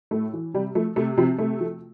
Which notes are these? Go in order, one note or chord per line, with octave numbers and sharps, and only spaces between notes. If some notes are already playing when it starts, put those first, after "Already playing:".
A2 A3
E3
C3 G3
F3 A3
C3 A3
C3 F3 C4
C3 A3
F3